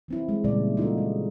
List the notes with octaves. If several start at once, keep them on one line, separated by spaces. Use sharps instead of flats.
E3 C4 E4
G#3
A#2 C#3 E3 G3 G#3 D5
D#4 F4 F#4 A4
G#3